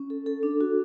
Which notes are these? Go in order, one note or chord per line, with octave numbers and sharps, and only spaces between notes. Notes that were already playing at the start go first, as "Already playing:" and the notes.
Already playing: C#4
A4
A4
D4
F#4